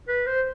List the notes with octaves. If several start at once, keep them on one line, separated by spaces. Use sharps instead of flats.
B4
C5